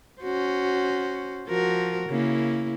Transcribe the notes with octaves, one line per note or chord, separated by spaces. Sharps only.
C#4 F#4 C5
F3 F#4 A#4
C#3 A#3 E4